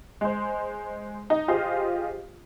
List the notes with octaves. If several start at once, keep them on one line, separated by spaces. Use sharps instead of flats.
G#3 C5
D#4
F4 G4 G#4 C5 D#5 F5